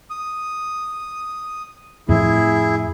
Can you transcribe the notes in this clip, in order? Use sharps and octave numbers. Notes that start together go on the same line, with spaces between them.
D#6
F2 A2 F3 E4 G#4